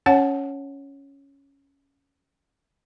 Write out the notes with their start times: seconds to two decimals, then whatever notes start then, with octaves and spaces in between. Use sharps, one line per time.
0.06 C#4 C#5 F#5 A5